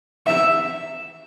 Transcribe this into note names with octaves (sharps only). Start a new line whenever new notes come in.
E5